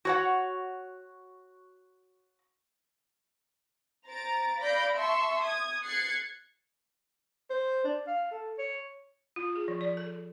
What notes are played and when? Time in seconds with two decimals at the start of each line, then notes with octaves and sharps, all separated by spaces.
0.05 F#4 C#5 F#5
4.08 C5 A#5 A6 D7
4.60 D5 F5 B5 G6 A#6 D7
4.98 E5 A5 C6 C#6 E6
5.43 D#6 G#6
5.85 F#6 G#6 A6 C7 C#7
7.50 C5
7.84 D4
8.07 F5
8.31 A4
8.58 C#5
9.36 F4
9.56 G#4
9.68 F3
9.81 D5
9.97 A4